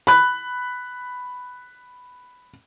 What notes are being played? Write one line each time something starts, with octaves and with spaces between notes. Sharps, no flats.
B5 F#6